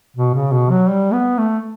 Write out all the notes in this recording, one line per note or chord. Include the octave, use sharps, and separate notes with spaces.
B2
C#3
B2
F#3
G3
B3
A3